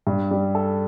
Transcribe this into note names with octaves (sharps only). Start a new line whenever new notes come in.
G2
G3
A4